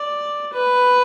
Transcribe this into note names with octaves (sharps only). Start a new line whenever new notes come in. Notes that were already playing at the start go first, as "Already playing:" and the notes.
Already playing: D5
B4